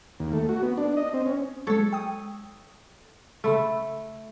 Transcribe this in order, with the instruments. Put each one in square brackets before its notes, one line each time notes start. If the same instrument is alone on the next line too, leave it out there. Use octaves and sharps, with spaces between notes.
[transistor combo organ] D#2
A3
F#4
B3
D4
D#5
C4
C#4
[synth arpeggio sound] F#3 G#3 [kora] A4 C#5
[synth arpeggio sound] G5 D#6
[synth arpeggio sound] C#3 B5 E6 [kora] A3